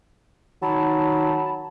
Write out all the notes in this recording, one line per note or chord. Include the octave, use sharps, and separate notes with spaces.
D#3 F#3 A5 B5